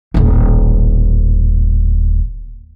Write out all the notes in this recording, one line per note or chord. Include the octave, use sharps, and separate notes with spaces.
D#1 A1